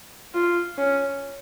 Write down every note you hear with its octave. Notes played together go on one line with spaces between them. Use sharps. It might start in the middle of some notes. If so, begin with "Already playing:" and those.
F4
C#4